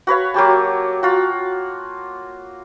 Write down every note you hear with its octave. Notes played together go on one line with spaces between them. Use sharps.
F#4 B4 C#5 F5
F#3 A#3 G4 A5
F4 F#4